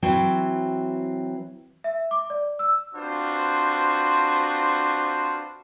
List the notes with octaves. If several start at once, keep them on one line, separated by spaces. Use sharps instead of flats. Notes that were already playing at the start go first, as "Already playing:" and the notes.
E3 F#3 C4 E4 G5
E5
D6
D5
E6
C4 D4 F4 F#4 B4 C5